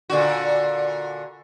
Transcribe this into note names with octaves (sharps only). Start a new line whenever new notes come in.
A#2 D3 F#4